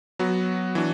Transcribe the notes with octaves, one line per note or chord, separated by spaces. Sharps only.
F#3 B3 F#4
E3 D4 F#4